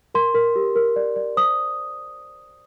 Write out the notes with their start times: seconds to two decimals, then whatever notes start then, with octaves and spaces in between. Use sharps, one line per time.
0.15 A#4 C6
0.34 A#4
0.56 G4
0.76 A#4
0.96 D5
1.16 D5
1.37 C5 D#6